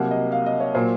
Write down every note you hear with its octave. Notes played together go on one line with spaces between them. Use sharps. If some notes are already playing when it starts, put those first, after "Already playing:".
Already playing: C2 C3 F#3 A#3 F#5
D#5
F5
D#5
C#5
A#2 F#3 A#3 C5